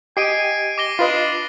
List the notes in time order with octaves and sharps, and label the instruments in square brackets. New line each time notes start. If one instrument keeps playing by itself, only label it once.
[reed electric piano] G4 D#5 G5 [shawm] G#5 [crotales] C7 D7 D#7
[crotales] D6 A#6 G7
[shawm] D4 [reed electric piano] F4 B4 D#5 [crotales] C7